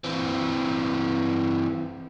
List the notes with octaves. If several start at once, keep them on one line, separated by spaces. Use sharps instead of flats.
E3 C4